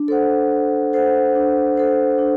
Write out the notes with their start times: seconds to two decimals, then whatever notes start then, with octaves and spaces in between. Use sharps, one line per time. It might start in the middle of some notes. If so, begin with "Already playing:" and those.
Already playing: D4
0.08 A4 C5 F#5
0.51 D4
0.93 A4 C5 F#5
1.35 D4
1.76 A4 C5 F#5
2.18 D4